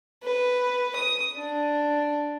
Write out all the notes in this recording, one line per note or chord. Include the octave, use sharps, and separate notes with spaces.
B4
D#6
D4